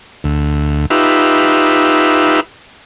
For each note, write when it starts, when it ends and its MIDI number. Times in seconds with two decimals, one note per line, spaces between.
0.24 0.86 38
0.90 2.40 63
0.90 2.40 65
0.90 2.40 67
0.90 2.40 71
0.90 2.40 76